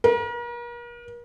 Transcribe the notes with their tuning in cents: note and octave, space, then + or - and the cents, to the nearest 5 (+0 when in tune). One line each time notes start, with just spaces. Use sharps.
A#4 +40